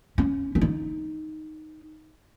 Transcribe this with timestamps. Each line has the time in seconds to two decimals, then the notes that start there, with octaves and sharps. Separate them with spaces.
0.18 C#4
0.55 C#4
0.61 D#4